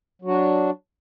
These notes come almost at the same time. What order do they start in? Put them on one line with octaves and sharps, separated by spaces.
F#3 F#4 D4